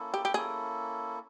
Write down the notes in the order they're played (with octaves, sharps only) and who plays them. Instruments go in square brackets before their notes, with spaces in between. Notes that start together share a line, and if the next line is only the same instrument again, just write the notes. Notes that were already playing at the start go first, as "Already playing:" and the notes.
Already playing: [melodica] A#3 C#4 E4 A4
[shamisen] G4
G4
[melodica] A#3 C#4 E4 A4 [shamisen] G#4